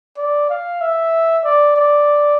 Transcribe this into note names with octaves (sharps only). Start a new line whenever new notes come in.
D5
F5
E5
D5
D5